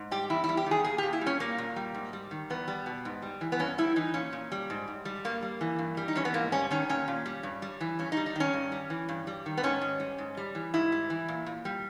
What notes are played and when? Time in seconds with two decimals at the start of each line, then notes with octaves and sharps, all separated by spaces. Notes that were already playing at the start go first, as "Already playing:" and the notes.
Already playing: G#2
0.11 G3 G4
0.30 E2 E4
0.44 E4
0.49 G3
0.57 G4
0.66 D#3 G#4
0.84 A#2 G#4
0.98 G4
1.03 A#2
1.13 E4
1.21 G3
1.27 C#4
1.40 A#2 A#3
1.58 A#2
1.76 G3
1.94 G#2
2.13 G3
2.31 D#3
2.50 E2 B3
2.68 G3
2.86 B2
3.05 G#2
3.22 G3
3.41 E3
3.52 B3
3.59 G2 C#4
3.78 G3 E4
3.96 E3 D#4
4.14 A#2 C#4
4.33 A#2
4.52 G3
4.70 G#2
4.88 G#2
5.05 G3
5.25 G2 A#3
5.42 G3
5.61 E3
5.79 G2
5.97 G3
6.08 D#4
6.15 E3 C#4
6.25 B3
6.34 G#2 A#3
6.52 G3 C#4
6.71 D#3 C#4
6.89 A#2 C#4
7.08 A#2
7.26 G3
7.43 G2
7.62 G3
7.81 E3
7.99 G2 C#4
8.12 D#4
8.17 G3
8.26 D#4
8.36 D#3 C#4
8.53 G2
8.72 G3
8.90 E3
9.09 G2
9.27 G3
9.46 D#3
9.57 B3
9.63 G#2 C#4
9.81 G#2
10.00 G3
10.18 G#2
10.37 G3
10.55 E3
10.74 G#2 E4
10.92 G3
11.10 E3
11.28 A#2
11.46 A#2
11.65 G3